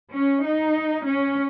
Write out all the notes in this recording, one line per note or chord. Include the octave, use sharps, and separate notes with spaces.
C#4
D#4
C#4